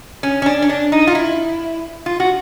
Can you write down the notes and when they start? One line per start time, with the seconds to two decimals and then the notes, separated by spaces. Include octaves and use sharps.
0.23 C#4
0.42 C#4
0.46 D4
0.62 C#4
0.69 D4
0.92 D#4
1.07 F4
1.15 E4
2.06 F4
2.20 F#4